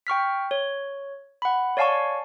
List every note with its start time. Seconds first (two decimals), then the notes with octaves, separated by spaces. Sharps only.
0.07 G5 C#6 F6 B6
0.51 C#5
1.42 F#5 B5
1.77 C#5 D5 F5 G#5 A5 C#6